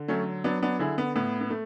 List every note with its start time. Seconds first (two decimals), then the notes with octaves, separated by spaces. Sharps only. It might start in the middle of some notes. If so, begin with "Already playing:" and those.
Already playing: D3
0.08 F#3 A3 C#4
0.44 F#3 B3 D4
0.63 B3 D4
0.79 D3 E4 G#4
0.98 B3
1.16 A2 B3
1.41 B3
1.50 A3